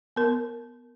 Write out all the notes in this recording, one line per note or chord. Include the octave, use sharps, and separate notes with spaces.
B3 A#4